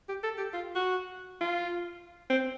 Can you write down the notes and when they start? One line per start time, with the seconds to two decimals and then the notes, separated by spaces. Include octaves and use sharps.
0.09 G4
0.23 A4
0.37 G4
0.53 F4
0.75 F#4
1.41 F4
2.30 C4